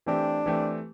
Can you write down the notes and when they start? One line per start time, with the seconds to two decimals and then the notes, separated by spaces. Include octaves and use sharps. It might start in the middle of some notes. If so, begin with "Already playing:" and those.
0.06 E3 A3 C4 D4 G4
0.46 E3 A3 C4 G4